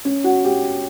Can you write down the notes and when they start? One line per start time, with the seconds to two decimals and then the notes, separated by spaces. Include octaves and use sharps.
0.05 C#4
0.24 F#4
0.44 G4